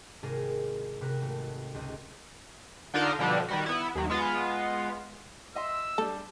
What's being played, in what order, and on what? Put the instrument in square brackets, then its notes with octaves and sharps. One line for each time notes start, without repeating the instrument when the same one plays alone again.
[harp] G#1 C3 G#4 A#4 A6
C3 F#4 A#4 B4
G#1 A3
C#2 C4 D#5
[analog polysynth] D3 D4 D#4 F4 A#4
B2 D3 F3 G3 D4
D#3 G3 F#4
B3 E4
D#2 F#3
G#3 B3 F4
[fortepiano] D#5 E5 C6 [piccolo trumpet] E6
[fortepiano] G3 D4 [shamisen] A4